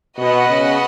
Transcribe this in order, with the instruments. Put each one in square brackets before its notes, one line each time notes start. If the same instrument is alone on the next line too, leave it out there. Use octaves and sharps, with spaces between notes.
[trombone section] B2 [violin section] B3 F#4 D#5 F#5
[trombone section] C#3